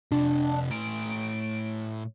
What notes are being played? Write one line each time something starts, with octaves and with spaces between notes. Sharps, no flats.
C3 D4 F4
A2 A#5 D7